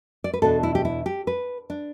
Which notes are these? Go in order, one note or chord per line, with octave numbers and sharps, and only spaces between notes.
D5
B4
E2 B2 B3 D4 A4
E4
G4
E4
G4
B4
D4